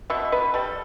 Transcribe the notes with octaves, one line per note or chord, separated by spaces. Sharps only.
B2 E5
B2 B4
G3 A4